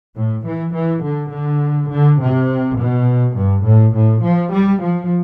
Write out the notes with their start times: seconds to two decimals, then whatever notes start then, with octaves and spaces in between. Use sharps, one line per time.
0.17 A2
0.45 E3
0.74 E3
1.04 D3
1.32 D3
1.91 D3
2.21 C3
2.78 B2
3.36 G2
3.66 A2
3.95 A2
4.24 F3
4.53 G3
4.82 F3